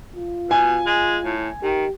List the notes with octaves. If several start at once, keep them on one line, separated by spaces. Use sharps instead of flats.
F4
B2 G#5
G#3
A2
D#3 G4